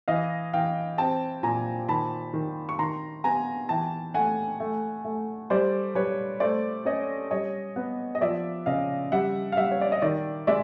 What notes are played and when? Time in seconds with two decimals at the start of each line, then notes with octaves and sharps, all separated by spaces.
0.08 E3 D#5 F5
0.53 E3 F5 G5
0.98 C4 G5 A5
1.43 A#2 G#5 A#5
1.89 D#3 A5 B5
2.34 D#3
2.69 C#6
2.79 D#3 A#5 C6
3.24 B3 G#5 A#5
3.69 E3 G5 A5
4.14 A3 F#5 G#5
4.60 A3
5.05 A3
5.50 G3 C5 D5
5.95 G3 B4 C#5
6.40 A3 C5 D5
6.85 C#4 C#5 D#5
7.31 G3 C#5 D#5
7.76 B3
8.15 D#5
8.21 F3 D5 E5
8.66 C#3 D#5 F5
9.12 G3 E5 F#5
9.52 F5
9.57 G3 E5 F#5
9.71 C#5
9.81 D5
9.92 D#5
10.02 D#3 D5 E5
10.47 G#3 D5 E5